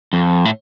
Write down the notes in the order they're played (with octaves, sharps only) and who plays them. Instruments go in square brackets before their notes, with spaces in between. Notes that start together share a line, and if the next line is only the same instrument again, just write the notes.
[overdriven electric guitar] F2
A2